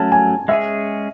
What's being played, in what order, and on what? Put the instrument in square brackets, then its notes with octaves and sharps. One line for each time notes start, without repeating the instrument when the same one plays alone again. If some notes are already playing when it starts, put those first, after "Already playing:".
Already playing: [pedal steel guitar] F#3 A3 C#4 [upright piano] A5
[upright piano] G#5
[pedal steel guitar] G#3 C#4 G#4 [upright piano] E5